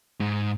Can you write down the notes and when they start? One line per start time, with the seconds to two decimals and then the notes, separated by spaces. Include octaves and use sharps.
0.20 G#2